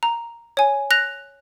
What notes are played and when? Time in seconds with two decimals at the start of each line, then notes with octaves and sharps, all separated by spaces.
0.03 A#5
0.57 C#5 G#5
0.91 F#6 A#6 F7